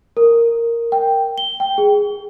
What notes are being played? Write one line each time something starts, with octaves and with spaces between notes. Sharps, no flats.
A#4
G5
G7
G5
G#4